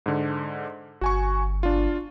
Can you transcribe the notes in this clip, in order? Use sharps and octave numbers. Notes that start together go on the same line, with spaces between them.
G#2 D3
G1 F#4 G#5 C#6
D4 F4